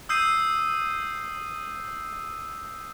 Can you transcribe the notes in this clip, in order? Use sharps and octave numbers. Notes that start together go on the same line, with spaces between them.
D#6 E6 G6 C7 D#7